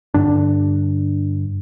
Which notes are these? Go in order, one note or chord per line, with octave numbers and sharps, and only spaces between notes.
G2 D3 D4